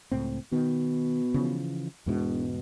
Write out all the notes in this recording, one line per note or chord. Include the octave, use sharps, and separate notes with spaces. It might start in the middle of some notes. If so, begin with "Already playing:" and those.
C#2 A2 C4
B2 D#3
C#3 E3 F3
E1 E2 G#2 B2